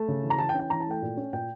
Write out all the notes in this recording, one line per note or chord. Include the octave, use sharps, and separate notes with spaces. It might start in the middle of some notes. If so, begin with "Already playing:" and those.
Already playing: A3 A5
C#3
E3
A#5
E3 A5
G5
C#4
G5
E3 A#5
A5
A3 G5
A#2
C#4
A#2 G5